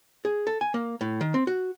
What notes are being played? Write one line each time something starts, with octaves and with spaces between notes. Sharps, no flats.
G#4
A4
G#5
A#3
A2
D#3
C4
F#4